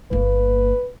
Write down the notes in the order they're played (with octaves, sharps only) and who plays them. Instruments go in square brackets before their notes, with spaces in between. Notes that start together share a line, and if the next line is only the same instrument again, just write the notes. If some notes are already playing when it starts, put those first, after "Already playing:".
[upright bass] G1 A#3 [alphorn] B4